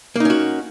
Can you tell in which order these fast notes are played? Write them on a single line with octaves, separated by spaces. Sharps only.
A#3 D#4 C#4 F#4